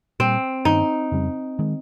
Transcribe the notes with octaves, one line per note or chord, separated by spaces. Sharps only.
A#2 G3 A#3 C4
G2 D#3 A#3 C#4 D#4
F2 C#3 G3
D#3 G#3